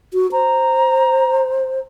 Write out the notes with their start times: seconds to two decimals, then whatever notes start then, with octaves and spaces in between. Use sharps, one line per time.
0.13 F#4
0.32 C5 A#5